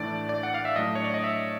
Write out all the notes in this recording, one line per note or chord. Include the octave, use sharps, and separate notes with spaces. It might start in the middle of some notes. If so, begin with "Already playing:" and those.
Already playing: A2 E3 A3 D4 D5
D5
F#5
F5
E5
A2 F#3 A3 D4 D#5
C#5
D5
D#5
E5